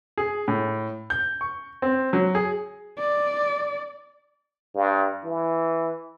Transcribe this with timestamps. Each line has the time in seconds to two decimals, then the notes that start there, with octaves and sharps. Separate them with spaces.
0.18 G#4
0.48 A2
1.10 G6
1.41 C#6
1.82 C4
2.13 F#3
2.35 G#4
2.98 D5
4.75 G2
5.24 E3